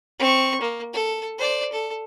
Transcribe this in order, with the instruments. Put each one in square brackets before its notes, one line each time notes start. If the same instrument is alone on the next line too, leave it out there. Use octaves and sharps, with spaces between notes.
[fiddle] C4 C#6
A#3
A4
C5 D5
A4